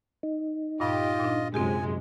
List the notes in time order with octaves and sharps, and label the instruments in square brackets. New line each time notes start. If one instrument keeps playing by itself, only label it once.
[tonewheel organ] D#4
[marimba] G2 A#2 [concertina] F4 D#5 [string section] G4
[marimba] A#2 D4
[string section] F#2 C3 G#3 [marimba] C4 F4 G4 [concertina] G#5